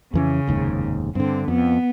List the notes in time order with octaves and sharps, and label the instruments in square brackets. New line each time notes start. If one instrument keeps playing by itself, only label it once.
[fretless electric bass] F2 E3 C#4 [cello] C#3
[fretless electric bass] F1 D#2 G#2
[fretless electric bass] G2 D3 [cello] C4
[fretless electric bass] F2 [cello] B3